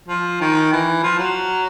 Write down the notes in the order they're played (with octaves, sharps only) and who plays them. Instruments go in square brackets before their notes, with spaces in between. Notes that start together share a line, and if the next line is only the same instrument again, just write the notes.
[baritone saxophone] F3
D#3
E3
F3
F#3